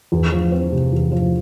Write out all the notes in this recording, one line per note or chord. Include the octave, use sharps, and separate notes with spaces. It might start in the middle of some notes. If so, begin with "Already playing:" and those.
E2
F3
C4
C3
E2
F3